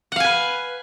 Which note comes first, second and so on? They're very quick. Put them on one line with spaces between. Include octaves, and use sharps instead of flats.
F#5 F5 G#5 B4